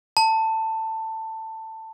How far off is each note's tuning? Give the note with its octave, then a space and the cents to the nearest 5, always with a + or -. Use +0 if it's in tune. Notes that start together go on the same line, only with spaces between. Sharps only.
A5 +15